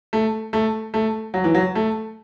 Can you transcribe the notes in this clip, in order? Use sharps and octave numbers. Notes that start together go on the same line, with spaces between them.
A3
A3
A3
F#3
E3
F#3
A3